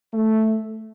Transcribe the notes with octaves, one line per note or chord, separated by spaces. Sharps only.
A3